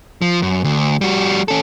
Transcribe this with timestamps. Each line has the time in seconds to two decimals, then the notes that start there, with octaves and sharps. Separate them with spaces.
0.22 F3
0.42 F#2
0.64 D2
1.01 G3 F#4
1.48 C#4 A4